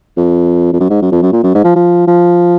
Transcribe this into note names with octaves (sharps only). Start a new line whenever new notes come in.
F2
F2
F#2
G#2
F#2
F2
F#2
A#2
F#2
G#2
F3
F3
F3